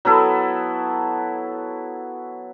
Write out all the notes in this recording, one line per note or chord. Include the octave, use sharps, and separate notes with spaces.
F#3 B3 E4 A4